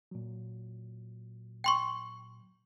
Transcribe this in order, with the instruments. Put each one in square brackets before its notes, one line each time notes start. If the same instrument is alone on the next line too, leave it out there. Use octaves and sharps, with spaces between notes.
[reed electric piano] A#2 F#3
[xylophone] G5 C6 C#6